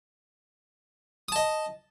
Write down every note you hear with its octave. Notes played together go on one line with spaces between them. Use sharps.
D#5 A5 D#6